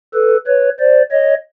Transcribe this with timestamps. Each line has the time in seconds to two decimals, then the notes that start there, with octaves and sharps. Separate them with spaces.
0.14 A4 B4
0.47 B4 C#5
0.79 C5 D5
1.11 C#5 D#5